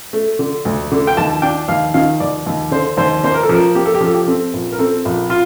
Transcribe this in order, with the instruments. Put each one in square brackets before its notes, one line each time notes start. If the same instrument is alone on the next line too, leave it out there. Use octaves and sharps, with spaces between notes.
[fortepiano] A3
D3
D2
D3
G5
D#2 A5
D4 G5
D#2 F5
D#3 F5
D#2 D5
D#2
D3 C5
D#2 C5
A#3 C5
A#4
A4
F3 A#4
A#3 G4
A4
G4
F3 A4
G4
C4 A4
A#1
A#4
C4 A4
A#1
F4